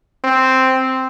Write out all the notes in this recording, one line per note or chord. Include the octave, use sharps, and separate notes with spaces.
C4